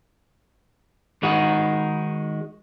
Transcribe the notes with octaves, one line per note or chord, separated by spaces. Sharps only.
D#3 G#3 D#4 F#4